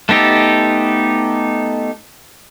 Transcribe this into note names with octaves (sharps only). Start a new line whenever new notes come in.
A3 B3 D#4 G4 A4